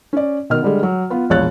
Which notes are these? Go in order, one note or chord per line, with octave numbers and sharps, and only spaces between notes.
C#4 D5
B2 D#3 D#5 F6
D3 G3 G#3
F#3
B3 F4
E1 A#1 C#5 F#6 A6